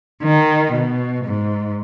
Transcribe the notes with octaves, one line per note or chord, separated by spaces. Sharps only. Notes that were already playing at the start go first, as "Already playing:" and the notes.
D#3
B2
G#2